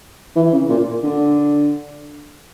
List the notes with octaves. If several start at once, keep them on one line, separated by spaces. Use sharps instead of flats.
E3
C#3
A#2
D3